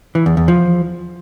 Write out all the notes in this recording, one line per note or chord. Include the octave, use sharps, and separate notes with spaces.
E3
E2
E2
F3